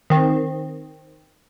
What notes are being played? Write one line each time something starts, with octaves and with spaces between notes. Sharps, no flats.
D#3 C4